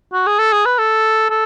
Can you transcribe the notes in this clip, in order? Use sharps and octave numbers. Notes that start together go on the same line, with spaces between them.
F#4
G#4
A4
G#4
B4
A4
A4